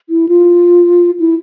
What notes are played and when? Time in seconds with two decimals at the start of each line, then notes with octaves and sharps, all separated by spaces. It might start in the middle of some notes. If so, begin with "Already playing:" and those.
0.10 E4
0.29 F4
1.20 E4